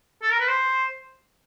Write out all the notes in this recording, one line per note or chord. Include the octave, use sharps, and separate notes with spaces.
A4
A#4
B4
C5